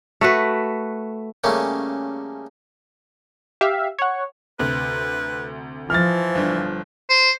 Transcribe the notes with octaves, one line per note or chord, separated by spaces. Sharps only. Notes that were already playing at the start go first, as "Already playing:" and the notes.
A3 F#4 B4
C#3 G3 A3 A#3 C#4
G4 E5 F5
C#5 F#5
D2 C3 B4
E3 F3 F6 A6
G1 D4
C5